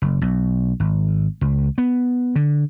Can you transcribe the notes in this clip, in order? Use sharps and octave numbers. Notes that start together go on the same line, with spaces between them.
F#1
B1
G#1
C#2
B3
D3